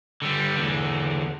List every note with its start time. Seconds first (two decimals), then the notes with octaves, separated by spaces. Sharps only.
0.22 D3 G3
0.55 E2 D3